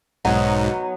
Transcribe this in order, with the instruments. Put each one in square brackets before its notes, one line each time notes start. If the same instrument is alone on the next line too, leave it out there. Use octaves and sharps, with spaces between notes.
[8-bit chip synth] B1 G#2 [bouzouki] F#3 B3 D#4